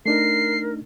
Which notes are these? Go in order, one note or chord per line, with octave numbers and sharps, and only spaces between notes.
A3 D4 D#4 A#4 C7